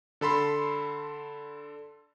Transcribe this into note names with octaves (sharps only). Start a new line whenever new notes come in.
D3 A4 B5 C6